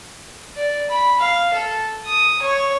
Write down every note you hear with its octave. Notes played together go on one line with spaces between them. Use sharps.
D5
B5
F5
A4
D#6
C#5